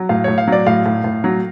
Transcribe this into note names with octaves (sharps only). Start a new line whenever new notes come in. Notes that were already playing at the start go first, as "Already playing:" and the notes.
Already playing: F#3
A2 F5
A2 C#5
F5
F#3 D5
A2 F5
A2
A2
F#3